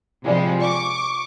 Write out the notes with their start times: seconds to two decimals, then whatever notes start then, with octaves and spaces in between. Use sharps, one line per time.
0.24 C3 F3 G3 G#3
0.62 C#6 D6